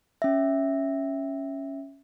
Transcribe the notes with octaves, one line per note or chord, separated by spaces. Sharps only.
C#4 E5